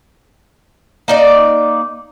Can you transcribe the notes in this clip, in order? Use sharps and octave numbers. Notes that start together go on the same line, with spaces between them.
A#3 D#4 D5